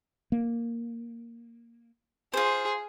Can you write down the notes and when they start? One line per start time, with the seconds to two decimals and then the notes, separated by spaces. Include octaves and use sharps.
0.32 A#3
2.33 F4 G#4 C5